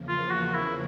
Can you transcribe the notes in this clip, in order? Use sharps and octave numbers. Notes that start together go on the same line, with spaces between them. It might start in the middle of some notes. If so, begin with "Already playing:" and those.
Already playing: E2 C#3 F3 A#3
F4
F#4
E4